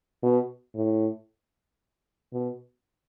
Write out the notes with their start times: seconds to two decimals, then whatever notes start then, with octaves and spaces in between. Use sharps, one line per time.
0.23 B2
0.75 A2
2.33 B2